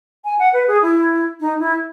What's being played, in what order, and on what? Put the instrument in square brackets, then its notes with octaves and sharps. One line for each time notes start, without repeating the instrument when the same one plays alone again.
[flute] G#5
F#5
B4
G#4
E4
D#4
E4